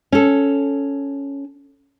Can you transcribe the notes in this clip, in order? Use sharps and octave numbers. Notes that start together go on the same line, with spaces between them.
C#4 A4